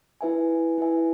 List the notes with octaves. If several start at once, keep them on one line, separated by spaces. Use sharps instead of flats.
E4 B4 E5 G#5
E4 B4 E5 G#5